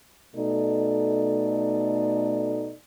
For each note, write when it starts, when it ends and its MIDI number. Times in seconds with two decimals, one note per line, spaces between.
0.36 2.73 47
0.36 2.73 57
0.36 2.73 63
0.36 2.73 69
0.36 2.73 74